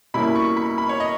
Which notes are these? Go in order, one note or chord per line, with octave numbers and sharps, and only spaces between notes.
B2 G3 A#3 C#4 E4 B5
C#6
B5
B5
C#5
D#5